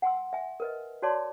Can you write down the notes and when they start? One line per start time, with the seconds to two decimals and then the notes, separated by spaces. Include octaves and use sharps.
0.02 F#5 G#5 C6 E6
0.33 E5 G#5
0.60 A#4 B4 D#5
1.02 F#4 C#5 D5 A5 C6 D6